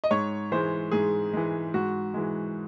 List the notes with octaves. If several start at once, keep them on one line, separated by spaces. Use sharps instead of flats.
D#5
G#2 C#5
E3 G#3 C5
G#2 G#4
E3 G#3
G#2 F#4
E3 G#3